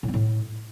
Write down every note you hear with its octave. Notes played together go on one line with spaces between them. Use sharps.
A2
C4
A2